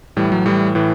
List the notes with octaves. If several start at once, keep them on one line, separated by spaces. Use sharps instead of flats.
A2 E3 G3
F#3
A2 E3 G3
A2 E3